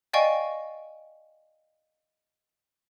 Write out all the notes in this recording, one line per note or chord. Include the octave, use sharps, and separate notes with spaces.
D5 D#5 F5 G5 G#5 C#6